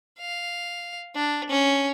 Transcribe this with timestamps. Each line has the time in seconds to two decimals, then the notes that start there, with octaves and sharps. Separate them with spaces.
0.19 F5
1.15 D4
1.49 C#4